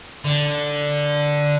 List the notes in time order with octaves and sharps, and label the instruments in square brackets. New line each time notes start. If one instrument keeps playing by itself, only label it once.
[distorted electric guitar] D3